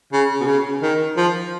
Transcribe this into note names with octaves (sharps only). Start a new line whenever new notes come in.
C#3
B2
C#3
D#3
F3